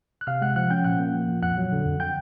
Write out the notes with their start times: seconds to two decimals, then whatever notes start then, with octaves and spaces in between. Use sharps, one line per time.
0.21 F#6
0.27 C3 F5 F6
0.42 G#3 F#5 F#6
0.56 F3 F#5 F#6
0.70 C#4 G5 G6
0.84 A#2 F#5 F#6
0.99 A#3
1.14 F3
1.28 A#2
1.42 F2 F#5 F#6
1.57 F#3
1.72 D3
1.86 F2
2.00 G5 G6